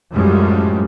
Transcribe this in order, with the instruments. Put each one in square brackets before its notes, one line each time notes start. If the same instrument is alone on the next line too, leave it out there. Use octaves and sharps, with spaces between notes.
[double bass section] F#2 A2 F3 G3 G#3